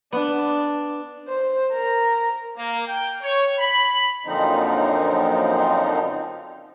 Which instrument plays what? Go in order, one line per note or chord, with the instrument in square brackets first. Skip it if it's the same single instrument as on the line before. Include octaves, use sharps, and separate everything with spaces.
[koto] B3 [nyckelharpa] D4
[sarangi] C5
A#4
[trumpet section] A#3
G5
C#5
B5
[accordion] F#2 A#2 D3 F3 C4 D#4